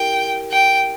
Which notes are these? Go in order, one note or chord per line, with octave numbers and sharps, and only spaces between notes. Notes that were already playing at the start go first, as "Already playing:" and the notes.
Already playing: E4 G4 A#4 G5
G5